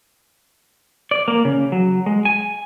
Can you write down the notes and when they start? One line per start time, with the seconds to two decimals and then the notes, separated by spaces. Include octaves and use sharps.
1.11 D5
1.28 A#3
1.45 C#3
1.72 F#3
2.06 G#3
2.25 G#5